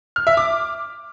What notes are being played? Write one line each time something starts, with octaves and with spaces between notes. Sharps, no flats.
F6
E5
D6